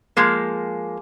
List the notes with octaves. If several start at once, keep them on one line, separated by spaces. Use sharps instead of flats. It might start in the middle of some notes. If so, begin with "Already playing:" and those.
F3 G#3 A#3